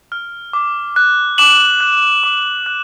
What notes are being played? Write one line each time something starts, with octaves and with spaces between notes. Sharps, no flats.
F6
D6
F#6
D6 E7 F#7
F#6
D6
F#6